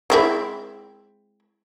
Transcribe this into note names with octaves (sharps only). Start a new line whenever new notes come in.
G#3 C4 E4